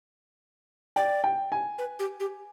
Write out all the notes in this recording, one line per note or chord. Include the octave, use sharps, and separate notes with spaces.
D5 G5
G5
G#5
B4
G4
G4